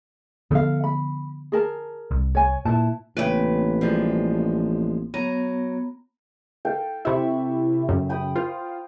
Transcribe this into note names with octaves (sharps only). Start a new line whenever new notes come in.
D3 F3 B3 A4 F5
B5
G#4 A#4 A5
C2
C#5 G#5
A#2 E4 B4 A5
A1 C#3 A#3 C4 B4 D5 G5
F3 G3 G#3
F#3 B3 A#5
A4 F5 G5
C3 E4 E5 B5 C#6
F#2 C#3
G5 B5 D#6
F4 C5